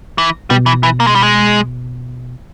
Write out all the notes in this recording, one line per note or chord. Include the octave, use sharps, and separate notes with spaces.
E3
B2 G3
E3
E3
A#3
G#3
G3
G#3